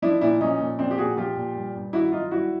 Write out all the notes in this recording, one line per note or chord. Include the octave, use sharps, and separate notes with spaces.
F3 D4 E4
A#2 D4 E4
F3 C#4 D#4
A#2
F3 C4 D4
G4
A#2 F#4 G#4
F3 F4 G4
A#2
G2
G2
D#3 E4 F#4
F#3 D#4 F4
G2 E4 F#4